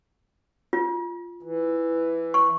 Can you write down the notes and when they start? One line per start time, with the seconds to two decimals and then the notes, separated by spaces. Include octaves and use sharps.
0.73 F4
1.43 E3
2.34 C#6